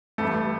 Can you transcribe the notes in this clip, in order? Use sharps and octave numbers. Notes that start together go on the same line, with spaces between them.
A1 G2 E3 A3